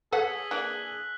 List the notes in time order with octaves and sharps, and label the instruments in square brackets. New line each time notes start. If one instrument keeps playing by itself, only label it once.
[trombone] G#4 [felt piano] A4 [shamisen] B4 C#5 F#5 [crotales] E6 B6
[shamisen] E3 A#3 D4 [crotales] F#6 F#7